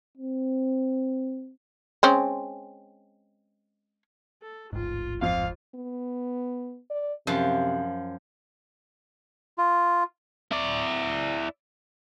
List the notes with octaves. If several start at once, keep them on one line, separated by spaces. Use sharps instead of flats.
C4
G#3 C4 C#4
A4
D1 A1 G#2 F4
F2 F4 F5
B3
D5
F#2 C3 F3
F4
E4 D5